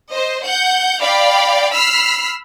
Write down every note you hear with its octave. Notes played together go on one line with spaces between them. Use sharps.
C5 D#5
F#5 G6
D5 F5 G5 B5
B5 E6 F6 B6 C7